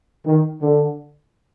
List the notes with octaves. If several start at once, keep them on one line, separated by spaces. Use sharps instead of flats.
D#3
D3